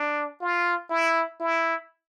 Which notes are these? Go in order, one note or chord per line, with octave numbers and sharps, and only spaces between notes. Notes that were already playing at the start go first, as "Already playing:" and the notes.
Already playing: D4
F4
E4
E4